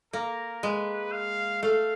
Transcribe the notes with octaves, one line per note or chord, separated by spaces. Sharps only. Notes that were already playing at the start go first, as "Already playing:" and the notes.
A#3 A#4
G#3 B4
F5
A3 F5